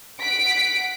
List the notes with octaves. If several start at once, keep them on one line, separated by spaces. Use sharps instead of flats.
F#5 B6 D7